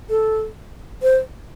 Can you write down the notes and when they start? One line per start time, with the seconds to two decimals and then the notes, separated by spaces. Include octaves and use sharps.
0.10 A4
1.02 C5